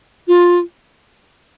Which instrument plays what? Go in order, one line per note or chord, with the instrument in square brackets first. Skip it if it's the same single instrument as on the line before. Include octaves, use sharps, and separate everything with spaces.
[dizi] F4